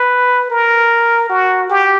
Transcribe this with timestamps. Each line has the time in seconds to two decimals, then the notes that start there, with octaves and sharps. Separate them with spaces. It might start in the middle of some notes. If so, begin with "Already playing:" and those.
Already playing: B4
0.50 A#4
1.29 F#4
1.69 G4